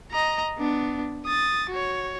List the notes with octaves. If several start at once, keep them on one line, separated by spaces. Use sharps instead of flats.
D#5 A#5
B3 D4
D#6 A6
F#4 C#5